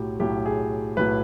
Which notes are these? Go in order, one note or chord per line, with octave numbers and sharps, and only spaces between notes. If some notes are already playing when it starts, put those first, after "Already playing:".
Already playing: B1 A2 F#3 G4
B1 A2 F#3 G4
G#4
B1 A2 F#3 B4